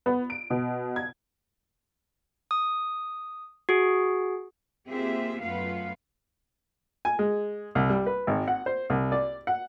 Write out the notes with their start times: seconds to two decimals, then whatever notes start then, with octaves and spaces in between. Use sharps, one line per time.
0.06 B3
0.30 D7
0.50 B2
0.96 G#6
2.51 D#6
3.69 F#4 G#4
4.88 A#3 C4 F4 G4 G#4 E5
5.41 F#2 A3 B3 F4 B4 F5
7.05 G#5
7.19 G#3
7.75 C2
7.90 G3
8.07 B4
8.27 G#1
8.48 F#5
8.66 C5
8.90 C2
9.12 D5
9.47 F#5